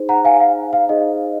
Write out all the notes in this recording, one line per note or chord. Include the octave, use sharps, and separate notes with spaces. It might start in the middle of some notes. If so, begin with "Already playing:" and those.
Already playing: D#4 G#4 C5
F#5 A#5
F5 G#5
F5
F5
D#4 G#4 C5 D#5